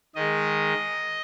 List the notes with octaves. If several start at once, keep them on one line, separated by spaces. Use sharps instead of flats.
D#3 G#3 D#5